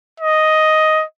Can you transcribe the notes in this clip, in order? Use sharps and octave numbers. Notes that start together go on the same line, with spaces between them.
D#5